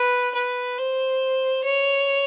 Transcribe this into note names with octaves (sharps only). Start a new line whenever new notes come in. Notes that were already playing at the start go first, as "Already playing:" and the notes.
Already playing: B4
B4
C5
C#5